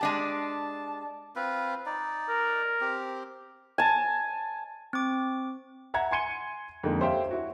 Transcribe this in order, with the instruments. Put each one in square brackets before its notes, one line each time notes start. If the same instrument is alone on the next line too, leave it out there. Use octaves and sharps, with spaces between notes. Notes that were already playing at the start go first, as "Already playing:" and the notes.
[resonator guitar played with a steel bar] G#3 D4 G4 [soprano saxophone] A5
[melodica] C4 F4 B4
D#4 D5
[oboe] A#4
[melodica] C4 G4
[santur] G#5 A5
[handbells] C4 D6
[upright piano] E5 F#5 A#5 G#6
G#5 C6 G#6 C#7 D#7 G7
F2 D3 G#3 A#3 D#4
G4 C5 C#5 E5 F5 G5
E4 F#4